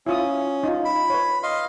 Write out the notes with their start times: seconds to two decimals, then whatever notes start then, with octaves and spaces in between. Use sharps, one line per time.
0.06 C#4 E4 F4 D#6
0.63 D#4 F4
0.85 B5
1.10 B4 C#5
1.43 D#5 F5 C6